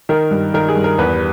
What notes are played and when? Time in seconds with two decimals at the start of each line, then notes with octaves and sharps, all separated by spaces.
0.09 D#3 A#4
0.31 G2
0.54 D#3 A#4
0.69 G#4
0.76 G2
0.84 A#4
0.98 E2 B4